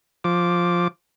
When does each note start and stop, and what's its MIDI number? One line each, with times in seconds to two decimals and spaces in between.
0.24 0.88 53
0.24 0.88 86